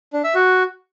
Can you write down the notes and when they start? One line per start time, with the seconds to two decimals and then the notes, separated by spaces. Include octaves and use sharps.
0.13 D4
0.24 E5
0.35 F#4